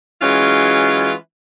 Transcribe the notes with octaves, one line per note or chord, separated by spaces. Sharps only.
E3 F#3 G#3 C#4 F4